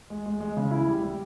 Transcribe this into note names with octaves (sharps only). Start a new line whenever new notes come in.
G#3
G#3
G#3
C#3
E4
G3
G3